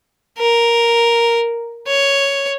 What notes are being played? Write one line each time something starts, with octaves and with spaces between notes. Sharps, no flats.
A#4
C#5